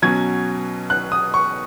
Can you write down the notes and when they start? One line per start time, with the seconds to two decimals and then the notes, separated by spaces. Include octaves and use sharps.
0.02 B2 F#3 C#4 G#6
0.90 F#6
1.12 D#6
1.34 C#6